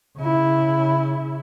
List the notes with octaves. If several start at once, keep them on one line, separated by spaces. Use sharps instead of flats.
C#3 E4